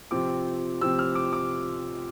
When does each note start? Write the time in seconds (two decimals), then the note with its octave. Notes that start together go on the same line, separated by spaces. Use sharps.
0.11 C3 F3 C4 D6
0.81 C3 F3 C4 E6
0.99 F6
1.15 D6
1.33 D6